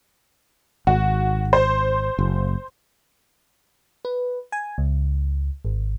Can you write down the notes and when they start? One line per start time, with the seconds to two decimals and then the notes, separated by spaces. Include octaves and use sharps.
0.87 G#1 F#4
1.53 C5
2.19 F#1
4.05 B4
4.52 G#5
4.78 C#2
5.65 G#1